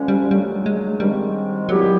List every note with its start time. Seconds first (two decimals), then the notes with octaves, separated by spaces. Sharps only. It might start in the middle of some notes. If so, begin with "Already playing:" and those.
Already playing: D2 D3 F3 G#3 C#4
0.08 G3
0.31 A#2 F#3 G3 A3 D4
0.66 G#3
1.00 G#2 D#3 G3 G#3 C4
1.68 A#2 F#3 G3 B3 E4 G4